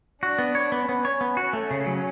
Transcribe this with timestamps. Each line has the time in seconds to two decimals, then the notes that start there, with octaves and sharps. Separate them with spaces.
0.22 D4 F#4
0.39 B3
0.55 C#5
0.72 B3
0.88 B3 C#4
1.05 C#5
1.21 B3
1.37 F#4
1.53 A3
1.71 C#3
1.86 F#3